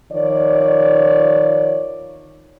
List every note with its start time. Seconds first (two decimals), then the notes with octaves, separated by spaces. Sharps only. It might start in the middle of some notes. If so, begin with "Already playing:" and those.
0.11 D#3 F3 C#5 D5